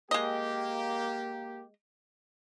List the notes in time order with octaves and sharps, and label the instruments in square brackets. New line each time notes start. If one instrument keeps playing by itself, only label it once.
[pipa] G#3 D#5 [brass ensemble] A#3 G4